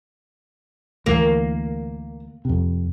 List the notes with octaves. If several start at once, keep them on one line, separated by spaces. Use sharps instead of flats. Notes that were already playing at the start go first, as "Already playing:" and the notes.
D2 E3 A#3
F2 C3